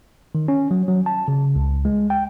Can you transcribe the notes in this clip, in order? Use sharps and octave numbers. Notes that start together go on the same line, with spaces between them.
D#3
C#4
F#3
F#3
A5
C#3
C#2
G#3
G5